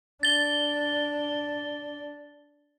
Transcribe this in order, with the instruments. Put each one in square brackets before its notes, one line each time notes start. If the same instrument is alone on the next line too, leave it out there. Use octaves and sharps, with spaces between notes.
[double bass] D4 [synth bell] A6 G7